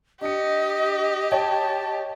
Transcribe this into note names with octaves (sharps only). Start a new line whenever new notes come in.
D4 G4 D#5 C#7
C#5 D#5 G5 A5